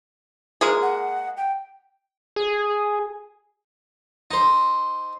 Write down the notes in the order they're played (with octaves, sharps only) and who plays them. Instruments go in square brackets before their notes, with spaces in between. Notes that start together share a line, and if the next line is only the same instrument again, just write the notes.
[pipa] G#3 A#3 G#4
[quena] F#5
G5
[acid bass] G#4
[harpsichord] D#4 C5